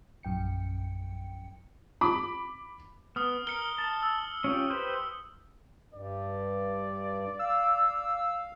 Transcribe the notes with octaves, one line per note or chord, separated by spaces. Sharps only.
A#1 F#2 G5 C#7
B5 D6
B3 D#6 F6
A#4 C#7 G7
A5
E6
C#4 F4 G4
G4 B4 C5
G2 D5
F5 E6